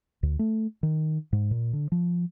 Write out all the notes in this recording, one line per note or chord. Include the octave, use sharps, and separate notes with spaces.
D2
A3
D#3
G#2
A#2
D3
F3